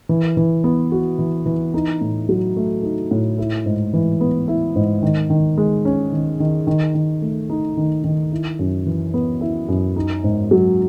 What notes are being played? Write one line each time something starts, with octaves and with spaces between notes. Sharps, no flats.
E3
E3
B3
F#4
E3
E3
D#4
A2
F#3
A3
D#4
A2
E4
G#2
E3
B3
E4
G#2
D#3
D#3
G#3
C#4
D#3
D#3
D#3
D#3
A3
D#4
D#3
D#3
E4
F#2
E3
B3
E4
F#2
D#4
G#2
F#3